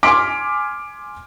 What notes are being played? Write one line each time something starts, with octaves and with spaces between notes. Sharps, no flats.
G#5 C6 D6 F6 B6 D7